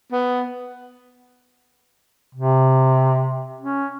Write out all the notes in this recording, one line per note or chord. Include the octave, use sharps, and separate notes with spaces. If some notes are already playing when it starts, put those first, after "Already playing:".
B3
C3
C#4